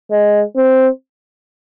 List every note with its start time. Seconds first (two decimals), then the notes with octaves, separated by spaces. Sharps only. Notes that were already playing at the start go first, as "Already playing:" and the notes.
0.11 G#3
0.56 C4